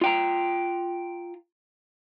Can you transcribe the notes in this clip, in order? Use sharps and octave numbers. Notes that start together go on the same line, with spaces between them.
F4 G5 A#5